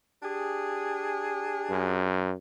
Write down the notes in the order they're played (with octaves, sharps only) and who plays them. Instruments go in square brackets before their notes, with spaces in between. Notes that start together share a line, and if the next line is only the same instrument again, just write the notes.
[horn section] D4 G4 G#4
[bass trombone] F#2